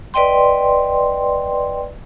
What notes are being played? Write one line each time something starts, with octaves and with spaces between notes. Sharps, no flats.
B4 D5 D#5 G5 C6